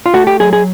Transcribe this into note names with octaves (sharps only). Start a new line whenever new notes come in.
F4
A3 F#4
G4
F#3 G#4
G#4